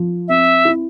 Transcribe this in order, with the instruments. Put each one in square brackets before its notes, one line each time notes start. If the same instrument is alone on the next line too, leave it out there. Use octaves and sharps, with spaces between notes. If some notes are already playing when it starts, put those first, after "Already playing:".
Already playing: [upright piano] F3
[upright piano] C4 [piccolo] E5
[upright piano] E4